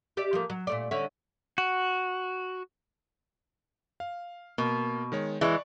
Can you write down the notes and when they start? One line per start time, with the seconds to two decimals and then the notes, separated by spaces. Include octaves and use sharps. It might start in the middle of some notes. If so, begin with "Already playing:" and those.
0.17 G4 D5 E5
0.33 F3 A3 A#3
0.50 F#3
0.67 A#2 A3 D5
0.91 D3 C#4 E5
1.58 F#4
4.00 F5
4.58 B2 A#3
5.12 D#3 G#3 C#5
5.41 E3 G#3 D5 C#6